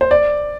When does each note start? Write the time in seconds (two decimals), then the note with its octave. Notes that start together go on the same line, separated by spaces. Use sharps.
0.01 C5
0.11 D5